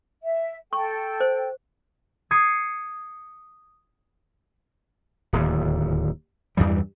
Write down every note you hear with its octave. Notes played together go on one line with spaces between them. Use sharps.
E5
A4 G5 C#6
C5
D#6 G#6 C7 C#7
D1 D#2
E2 G2 E3 G3